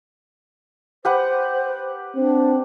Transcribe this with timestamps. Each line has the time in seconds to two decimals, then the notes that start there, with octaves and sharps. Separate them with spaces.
1.05 G4 B4 C5 F#5
2.16 C4 D4